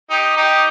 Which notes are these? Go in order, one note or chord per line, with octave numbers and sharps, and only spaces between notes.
D#4 G4
D#4 G4